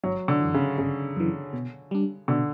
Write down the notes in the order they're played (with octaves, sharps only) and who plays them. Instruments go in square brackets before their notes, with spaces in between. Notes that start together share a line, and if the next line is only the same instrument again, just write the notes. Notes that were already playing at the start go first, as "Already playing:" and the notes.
[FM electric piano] G1 [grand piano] F#3
[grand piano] D3
[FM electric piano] F#2 E3
[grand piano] C#3
[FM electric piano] G1 [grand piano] C#3
[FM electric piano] F#2 E3
B2
G3 D4
[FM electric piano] B2 [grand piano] D3